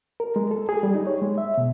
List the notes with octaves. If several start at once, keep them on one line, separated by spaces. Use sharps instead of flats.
A#4
G#3
A4
G#4
G3
D#4
C#5
G#3
E5
B2